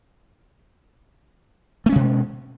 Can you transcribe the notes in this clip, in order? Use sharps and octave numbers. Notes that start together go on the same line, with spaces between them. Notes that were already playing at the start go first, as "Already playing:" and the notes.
B2 G#3 A3 C#4